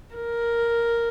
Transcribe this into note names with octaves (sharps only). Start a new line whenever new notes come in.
A#4